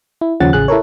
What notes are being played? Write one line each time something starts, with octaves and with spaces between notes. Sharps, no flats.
E4
D#2 C#3 F3 C#4 F#5 A6
A1 C#3 G#4 F#6
E4 A4 A#4 C#5